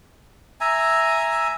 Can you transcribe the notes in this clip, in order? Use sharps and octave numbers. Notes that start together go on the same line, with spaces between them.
E5 G#5 A#5